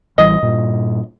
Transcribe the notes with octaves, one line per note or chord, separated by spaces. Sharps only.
A1 E3 G3 D#5
G2 A#2